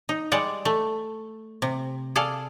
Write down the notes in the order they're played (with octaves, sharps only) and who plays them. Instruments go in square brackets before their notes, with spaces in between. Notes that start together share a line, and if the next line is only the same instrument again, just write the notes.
[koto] D#4
G3 G#3 D5 F#5
A3
C3
G#4 A4 D5 F5